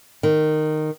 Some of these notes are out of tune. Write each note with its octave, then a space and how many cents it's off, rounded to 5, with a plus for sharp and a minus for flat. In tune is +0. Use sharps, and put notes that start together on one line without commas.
D#3 -10